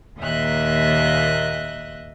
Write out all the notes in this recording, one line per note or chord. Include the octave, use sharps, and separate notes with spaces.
D#2 A#2 D#5 E5 F#6